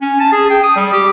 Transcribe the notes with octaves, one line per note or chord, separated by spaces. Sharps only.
C#4
A5
G#4
G5
D#6
G3
G4